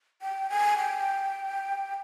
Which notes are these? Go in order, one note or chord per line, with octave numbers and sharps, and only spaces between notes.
G5
G#5
G5